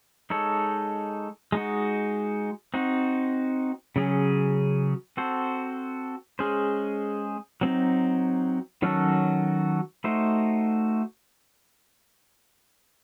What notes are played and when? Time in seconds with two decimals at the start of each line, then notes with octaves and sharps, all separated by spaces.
0.30 G#3 D#4 A4 C#5
1.52 G#3 D#4 F#4
2.74 C4 D#4 F#4
3.96 C#3 F#3 C#4 G#4
5.17 C4 F#4 A4 C5
6.39 G#3 C#4 G#4 C5
7.61 F#3 C4 D#4
8.82 D#3 F#3 C#4 F#4 A4
10.04 A3 D#4 F#4 C5